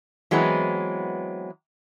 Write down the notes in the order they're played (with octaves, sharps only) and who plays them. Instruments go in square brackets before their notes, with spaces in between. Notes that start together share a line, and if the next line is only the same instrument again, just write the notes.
[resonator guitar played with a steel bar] E3 F#3 G#3 B3 C4